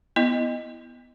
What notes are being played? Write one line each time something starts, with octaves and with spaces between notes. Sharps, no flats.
B3 E4 D#5